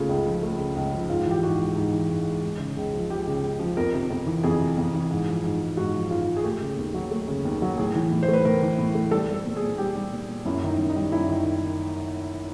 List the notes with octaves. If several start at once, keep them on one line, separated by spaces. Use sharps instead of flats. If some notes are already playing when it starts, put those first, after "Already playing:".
Already playing: C#3 A3 F4
C#2
F3
A3
C#3
C#2
F3
G#2 F4
E3 G4
G#2 F#4
G#3
G#2
E3
G#2
G#3
G#3
C#3
C#2
F3
G#3 G4
C#3
C#2
F3
F2 A#4
C3
F2
E3
F2 G#4
C3
F2
E3
G#2
F3
G#2
G#3
G#2 F#4
F3
G#2 F4
G#3
G#4
A3 G4
C#3
D#2
F#3
A3
C#3
D#2
F#3
A2 G#4
E3
A2
C5
A3
B4
A2 A#4
E3
A2
A3
G3 A4
G3
A4
A#2
G#4
A#2
G3 G4
G3
A#2
A#2
F#2 E4
D#3
D#4
F#2
D#4
G3
F#2 E4
D#3